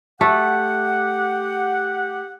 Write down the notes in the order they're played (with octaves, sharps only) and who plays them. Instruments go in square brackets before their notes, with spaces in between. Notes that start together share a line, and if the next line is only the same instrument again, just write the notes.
[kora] A3 [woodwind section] G4 F#5